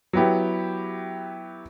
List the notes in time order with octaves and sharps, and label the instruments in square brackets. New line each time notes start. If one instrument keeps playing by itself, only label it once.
[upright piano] F#3 B3 E4 G4